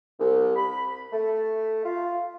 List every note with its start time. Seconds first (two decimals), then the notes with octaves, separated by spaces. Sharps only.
0.19 C2
0.55 B5
1.13 A3
1.84 F4